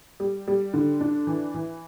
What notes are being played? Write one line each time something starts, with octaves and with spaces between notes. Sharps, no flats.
G3
G3
D3
D4
E3
E3